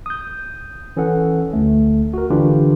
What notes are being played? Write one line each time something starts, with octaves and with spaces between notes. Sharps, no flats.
D#6 G6
E3 C#4 A4 F#5
D2 A3
F#4 A#4
D3 E3 D4 F4 G4 B4